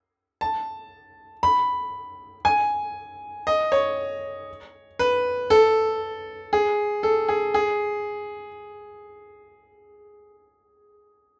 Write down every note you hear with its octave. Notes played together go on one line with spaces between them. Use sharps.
A5
B5
G#5
D#5
C#5
B4
A4
G#4
A4
G#4
G#4